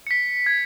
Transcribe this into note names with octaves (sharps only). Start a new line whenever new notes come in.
C#7
B6
G#6